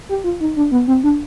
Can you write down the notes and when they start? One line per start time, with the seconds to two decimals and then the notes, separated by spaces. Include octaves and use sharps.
0.09 G4
0.24 F4
0.40 D#4
0.56 D4
0.72 B3
0.87 C4
1.04 D4